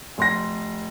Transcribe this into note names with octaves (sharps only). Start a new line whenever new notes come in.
F1 C6 A#6